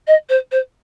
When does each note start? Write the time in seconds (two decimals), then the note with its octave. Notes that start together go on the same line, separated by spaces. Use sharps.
0.07 D#5
0.29 C5
0.51 C5